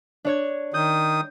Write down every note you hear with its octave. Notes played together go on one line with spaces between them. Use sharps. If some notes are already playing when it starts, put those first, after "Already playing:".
D4 C#5 G#6
D#3 D#6 G6